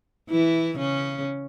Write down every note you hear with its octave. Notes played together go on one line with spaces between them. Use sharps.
E3 E4
C#3 C#4